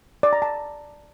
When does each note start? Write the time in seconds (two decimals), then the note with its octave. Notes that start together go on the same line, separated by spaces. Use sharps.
0.23 D5
0.33 A#5
0.42 A5